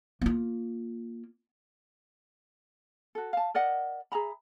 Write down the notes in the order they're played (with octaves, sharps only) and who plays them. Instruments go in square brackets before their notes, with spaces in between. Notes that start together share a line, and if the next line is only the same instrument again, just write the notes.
[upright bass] A#3 F4
[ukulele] F#4 A4
F5 A5
A#4 D5 D#5 F#5
G#4 E5 A#5 B5